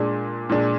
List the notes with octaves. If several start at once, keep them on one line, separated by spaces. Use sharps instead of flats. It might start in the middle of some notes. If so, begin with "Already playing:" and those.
Already playing: A#2 G#3 D4
A#2 G#3 D4